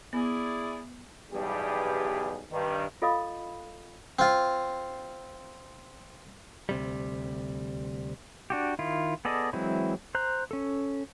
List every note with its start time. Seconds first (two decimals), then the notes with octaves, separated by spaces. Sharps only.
0.13 B3 E4 G#4 D5
1.31 B1 E2 G2 G3 G4 G#4
2.50 G2 D#3
3.02 F4 A4 D#5 F5 B5 D#6
4.19 C4 F4
6.69 D2 C3 G3
8.50 D4 F#4 G4
8.79 D#3 E4 F4
9.25 B3 G#4 A4 D5 D#5
9.53 E3 F#3 G#3 C4 E4
10.15 C5 A#5 F#6
10.51 C#4 A4